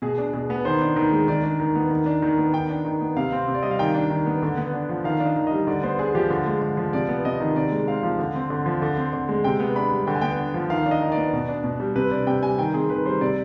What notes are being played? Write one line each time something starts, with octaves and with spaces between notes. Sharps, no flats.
B2 G#4
D4
B2 G#4
B3
D#3 C5
D4
D#3
G#3
D#3 D5
D4
D#3
B3
D#3
D4
D#3
B3
D#3 G5
D4
D#3
B3
C3 F5
C4
C3
D5
G3 D#5
F5
D#3 G5
D4
D#3
B3
D3
B3
D4
F3
D#3 F5
D4
D#5
D#3
G3 D#5
D3 D5
B3 C5
D4 G#4
F3 G4
D3
G#3
D3
F3
C3 D5
B3
C3 D#5
D#3
C3 D5
G#3
C4 F5
F3
D3
C4
D3
F3
D3
C4
D3
G#3
C3 G5
B3
D4 B5
G3
D3 G5
G#5
B3 G5
D4
F3
D#3 F5
D4
D#5
D#3
D5
B3
B2
D4
B2
G3
C3 B4
D4 D5
C3 G5
G3 G#5
D#3 G5
C4 G#4
D#3 B4
G3 C5
C3 D5